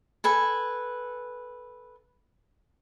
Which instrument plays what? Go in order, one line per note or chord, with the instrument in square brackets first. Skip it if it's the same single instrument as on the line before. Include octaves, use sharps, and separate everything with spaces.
[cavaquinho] A4 B4 G#5